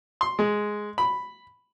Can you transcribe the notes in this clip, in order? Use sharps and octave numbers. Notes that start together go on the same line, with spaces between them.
C6
G#3
B5